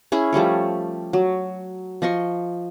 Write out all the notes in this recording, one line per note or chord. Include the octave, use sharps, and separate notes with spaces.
C#4 E4 G#4
F3 G3 A3 C#5
F#3
F3 D#5 C6 C#6